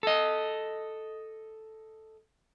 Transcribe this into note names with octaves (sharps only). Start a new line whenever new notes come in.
A4 D#5